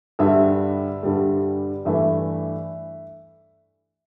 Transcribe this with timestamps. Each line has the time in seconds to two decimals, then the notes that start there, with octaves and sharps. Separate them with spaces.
0.19 G2 D3 G3 E5
1.03 G2 D3 G3
1.85 G2 E3 A3 E5